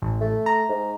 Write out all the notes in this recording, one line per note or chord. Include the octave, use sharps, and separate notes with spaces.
A1
A3
A#5
G#2